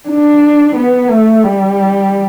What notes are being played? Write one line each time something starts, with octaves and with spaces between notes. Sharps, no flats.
D4
B3
A3
G3